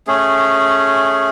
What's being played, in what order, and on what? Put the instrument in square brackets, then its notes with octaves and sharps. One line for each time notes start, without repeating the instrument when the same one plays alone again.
[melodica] A3 C#4 G#4